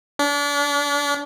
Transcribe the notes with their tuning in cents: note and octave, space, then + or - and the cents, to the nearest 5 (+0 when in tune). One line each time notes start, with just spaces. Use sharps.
D4 -35